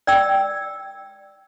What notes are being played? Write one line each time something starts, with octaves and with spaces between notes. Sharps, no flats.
D5 G5 E6